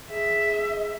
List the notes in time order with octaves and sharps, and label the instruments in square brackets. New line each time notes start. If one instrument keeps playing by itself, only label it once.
[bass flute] G#4 [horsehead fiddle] E5